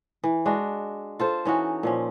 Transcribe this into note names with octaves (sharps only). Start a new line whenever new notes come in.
E3
G#3 D4 F#4
F4 A4 C5
E3 C#4 D#4 F#4
A#2 F3 C#4